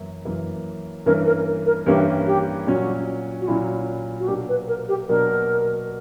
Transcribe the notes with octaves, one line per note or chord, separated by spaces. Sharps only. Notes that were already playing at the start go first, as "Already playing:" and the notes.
Already playing: F#2 E3 A#3 E4
F#2 E3 A#3 E4
G2 E3 A#3 C#4 E4 A#4
A#4
A#4
G2 E3 A#3 C#4 E4 G4
G4
A#2 F#3 C#4 F#4
F#4
A#2 F#3 C#4 E4
F#4
B2 F#3 A#3 D4 G4
B4
A#4
G4
B2 F#3 A#3 D4 A#4